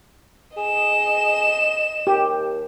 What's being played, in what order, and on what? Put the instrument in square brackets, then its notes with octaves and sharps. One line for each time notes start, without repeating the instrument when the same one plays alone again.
[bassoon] G#4 [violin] D#5 E7
[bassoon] D#2 [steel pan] G4